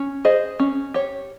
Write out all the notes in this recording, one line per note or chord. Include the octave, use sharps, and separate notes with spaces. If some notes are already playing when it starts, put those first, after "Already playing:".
Already playing: C#4
G#4 C5 D#5
C#4
G4 C#5